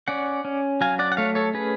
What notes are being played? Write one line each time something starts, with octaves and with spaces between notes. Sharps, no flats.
C#4 D5 F#5
C#4
F#3 F5 G#5
D5 F#5
F#5
A3 C#5 F5
A4 C#5
C#4 G#4 B4